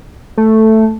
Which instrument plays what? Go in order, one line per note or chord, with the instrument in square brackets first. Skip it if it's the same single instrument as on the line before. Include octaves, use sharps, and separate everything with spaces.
[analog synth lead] A3